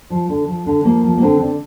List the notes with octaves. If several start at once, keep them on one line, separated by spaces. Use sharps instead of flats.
F3
D3
F3
D3
F3 A#3
F3
A#3
D3 C4
D3